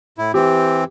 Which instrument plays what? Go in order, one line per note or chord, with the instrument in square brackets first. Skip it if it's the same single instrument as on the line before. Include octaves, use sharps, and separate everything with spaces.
[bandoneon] A2 E4
[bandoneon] E3 C4 [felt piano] G4